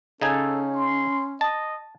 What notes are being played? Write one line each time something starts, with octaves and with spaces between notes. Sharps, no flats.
C#3 C#4 D#4 A4 G#5
C6
D#5 A5